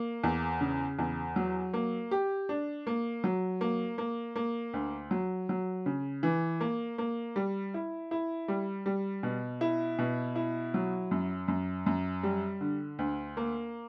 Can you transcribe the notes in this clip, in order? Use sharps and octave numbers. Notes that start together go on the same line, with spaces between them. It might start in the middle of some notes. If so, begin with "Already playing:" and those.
Already playing: A#3
E2
C#3
E2
F#3
A#3
G4
D4
A#3
F#3
A#3
A#3
A#3
D2
F#3
F#3
C#3
E3
A#3
A#3
G3
E4
E4
G3
G3
B2
E4
B2
E4
F#3
F#2
F#2
F#2
G3
D3
D2
A#3